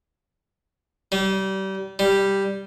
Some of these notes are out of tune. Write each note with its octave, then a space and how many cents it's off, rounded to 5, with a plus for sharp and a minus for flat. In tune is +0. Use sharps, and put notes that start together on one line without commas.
G3 -30
G3 +0